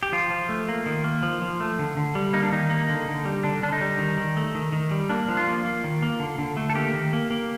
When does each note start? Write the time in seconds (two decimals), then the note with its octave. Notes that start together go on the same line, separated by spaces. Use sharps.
0.03 G4
0.12 F3 F4
0.31 F3
0.49 A3
0.69 A#3
0.86 D#3
1.04 A#3
1.23 F3
1.42 F3
1.60 A3
1.79 D3
1.97 D3
2.15 G3
2.33 A#3 D#4
2.43 D4
2.52 D#3 D#4
2.70 A#3
2.89 D3
3.08 D3
3.25 G3
3.44 D3 D4
3.63 D3 D4
3.72 D#4
3.81 G3
3.99 D#3
4.17 D#3
4.37 A3
4.55 D#3
4.72 D#3
4.91 G3
5.10 A#3 D4
5.29 F3
5.37 F4
5.47 A#3
5.64 A#3
5.84 D#3
6.02 A#3
6.20 D3
6.39 D3
6.57 A3
6.70 A4
6.75 A#3 G4
6.93 D#3
7.13 A#3
7.31 A#3